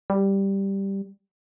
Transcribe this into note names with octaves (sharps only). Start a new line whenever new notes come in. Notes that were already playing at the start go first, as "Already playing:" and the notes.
G3